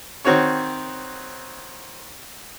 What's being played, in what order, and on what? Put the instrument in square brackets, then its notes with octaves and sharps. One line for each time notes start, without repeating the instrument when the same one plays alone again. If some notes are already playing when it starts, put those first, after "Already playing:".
[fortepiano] D#3 C4 F#4 C#5 C#6